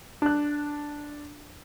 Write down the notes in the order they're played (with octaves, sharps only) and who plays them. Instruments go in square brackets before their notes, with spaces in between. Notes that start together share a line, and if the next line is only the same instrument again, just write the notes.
[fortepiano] D4 F#6